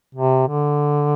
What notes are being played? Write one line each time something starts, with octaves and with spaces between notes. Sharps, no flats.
C3
D3